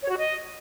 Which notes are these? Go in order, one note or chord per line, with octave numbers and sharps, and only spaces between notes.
C#5
F#4
D#5